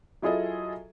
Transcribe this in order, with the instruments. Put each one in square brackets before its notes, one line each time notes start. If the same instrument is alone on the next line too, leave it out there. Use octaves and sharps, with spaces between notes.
[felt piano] F#3 E4 F4 G#4 A4 D#5